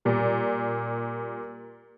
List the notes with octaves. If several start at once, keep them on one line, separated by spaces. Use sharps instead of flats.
A#2 G3